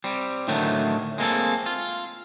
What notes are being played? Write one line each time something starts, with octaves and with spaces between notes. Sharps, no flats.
G3 C4
A2 D3 D#3 F#3 A3
G#3 A#3 C4 A4
F4